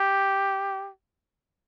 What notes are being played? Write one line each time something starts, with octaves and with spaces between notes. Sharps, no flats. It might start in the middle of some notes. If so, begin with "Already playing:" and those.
Already playing: G4